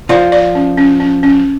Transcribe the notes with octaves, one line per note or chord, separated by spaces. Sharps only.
F3 F4 D5
D5
C#4
C#4
C#4
C#4